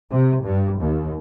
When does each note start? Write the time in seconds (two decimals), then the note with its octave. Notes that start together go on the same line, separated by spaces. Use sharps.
0.11 C3
0.43 G2
0.79 D#2